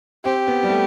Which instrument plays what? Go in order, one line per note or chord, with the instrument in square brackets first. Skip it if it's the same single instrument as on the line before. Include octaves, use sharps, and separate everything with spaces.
[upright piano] C4 [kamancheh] G4
[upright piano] B3
G3
A3